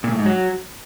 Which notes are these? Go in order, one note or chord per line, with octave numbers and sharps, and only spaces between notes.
A#2
A2
G#2
F#3